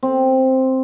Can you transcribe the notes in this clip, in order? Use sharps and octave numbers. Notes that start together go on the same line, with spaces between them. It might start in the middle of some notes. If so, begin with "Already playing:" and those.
C4